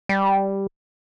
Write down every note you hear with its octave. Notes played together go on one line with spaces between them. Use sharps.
G3